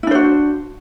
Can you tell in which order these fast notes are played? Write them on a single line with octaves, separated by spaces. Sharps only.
E4 D4 C5 F#4